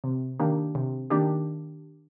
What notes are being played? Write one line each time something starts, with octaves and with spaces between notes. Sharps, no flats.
C3
D#3 A#3 D4 G4
C3
D#3 A#3 D4 G4